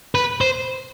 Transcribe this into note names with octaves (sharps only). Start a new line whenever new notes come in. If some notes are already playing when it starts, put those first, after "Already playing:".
B4
C5